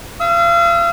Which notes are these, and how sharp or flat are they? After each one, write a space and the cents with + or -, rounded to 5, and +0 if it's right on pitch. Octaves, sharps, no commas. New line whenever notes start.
F5 -40 E6 -45